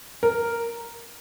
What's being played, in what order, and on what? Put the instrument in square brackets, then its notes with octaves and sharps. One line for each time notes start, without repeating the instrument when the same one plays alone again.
[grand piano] A#4